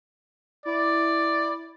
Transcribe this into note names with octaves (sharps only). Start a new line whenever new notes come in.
E4 D5